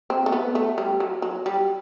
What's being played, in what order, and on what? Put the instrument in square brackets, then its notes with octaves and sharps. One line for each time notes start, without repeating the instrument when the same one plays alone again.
[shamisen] C4
A3
B3
A3
G3
F#3
F#3
G3